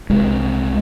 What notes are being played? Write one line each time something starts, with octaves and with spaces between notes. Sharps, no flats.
C2 C3 G#3